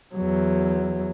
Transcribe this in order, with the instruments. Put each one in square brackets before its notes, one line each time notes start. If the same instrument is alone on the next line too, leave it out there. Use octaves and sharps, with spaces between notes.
[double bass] E2 F#3